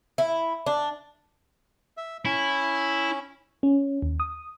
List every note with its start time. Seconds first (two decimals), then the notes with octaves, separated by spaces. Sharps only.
0.18 E4
0.66 D4
1.97 E5
2.25 C#4 E4
3.63 C#4
4.02 D#2
4.20 D#6